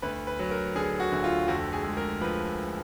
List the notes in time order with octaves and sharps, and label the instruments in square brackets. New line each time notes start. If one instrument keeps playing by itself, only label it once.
[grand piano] D2 B4
B4
F#3
A#4
D3 G#4
F#4
D2
F4
F2 F#4
G#4
G#3
A#4
F3 B4